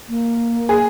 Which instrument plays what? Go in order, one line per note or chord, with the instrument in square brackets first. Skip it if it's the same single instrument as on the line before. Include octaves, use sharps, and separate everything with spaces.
[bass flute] A#3
[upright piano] G#4